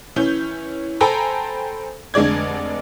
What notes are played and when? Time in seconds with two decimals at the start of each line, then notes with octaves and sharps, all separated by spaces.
0.16 E3 C#4 G6
1.01 A4 C5 G5 G#5 A#5 B5
2.14 F1 D3 G#3 D5 G#6